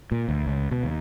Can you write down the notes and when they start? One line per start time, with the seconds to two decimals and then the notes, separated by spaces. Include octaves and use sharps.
0.12 A#2
0.29 D2
0.46 C#2
0.71 B2
0.84 D#2